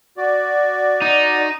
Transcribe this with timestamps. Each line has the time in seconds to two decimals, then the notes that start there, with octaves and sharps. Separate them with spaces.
0.17 F#4 D5
1.02 D#4